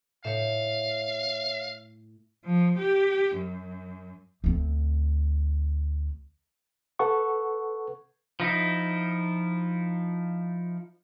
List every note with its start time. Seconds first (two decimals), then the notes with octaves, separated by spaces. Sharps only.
0.25 A2 C#5 E5 F5
2.45 F3
2.79 G4
3.38 F#2
4.44 D2 C4
6.99 A4 B4 F#5 C#6
8.40 F3 D#4 E4